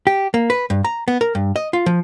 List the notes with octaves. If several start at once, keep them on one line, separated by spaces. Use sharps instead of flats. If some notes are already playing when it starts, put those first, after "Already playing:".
G4
A#3
B4
G2
A#5
B3
A#4
G2
D#5
F4
F3